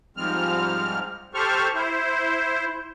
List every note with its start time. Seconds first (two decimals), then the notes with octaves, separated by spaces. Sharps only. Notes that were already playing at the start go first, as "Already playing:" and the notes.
0.17 G#2 F3 G3 G#3 C4 F6
1.34 G4 A4 C5 C#6 F6
1.75 E4 C5